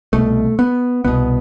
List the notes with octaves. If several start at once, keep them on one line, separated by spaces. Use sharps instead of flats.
C2 B2 A3
B3
C2 B2 B3